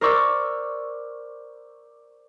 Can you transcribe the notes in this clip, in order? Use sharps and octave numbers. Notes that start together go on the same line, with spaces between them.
A#4 C5 D5 C#6 D6 E6